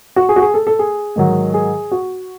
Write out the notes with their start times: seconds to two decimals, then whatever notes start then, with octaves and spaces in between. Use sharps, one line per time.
0.16 F#4
0.29 G#4
0.36 F#4
0.42 G#4
0.54 A4
0.67 A4
0.79 G#4
1.16 G#2 D#3 F#3
1.54 G#4
1.91 F#4